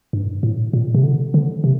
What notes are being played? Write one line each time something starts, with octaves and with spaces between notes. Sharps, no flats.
G2
A2
A#2
C3
D3
D3
C3